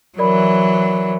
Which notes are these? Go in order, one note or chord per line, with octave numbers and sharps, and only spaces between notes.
E3 F#3 A#4 D5 B5